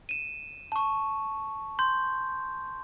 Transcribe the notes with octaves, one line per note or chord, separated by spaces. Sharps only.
D#7 E7
A5 C#6
C6 G6